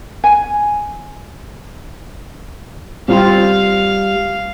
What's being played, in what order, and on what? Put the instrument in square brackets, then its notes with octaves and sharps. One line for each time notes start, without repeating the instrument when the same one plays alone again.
[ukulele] G#5
[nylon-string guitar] G3 [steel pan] C4 F4 [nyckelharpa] F5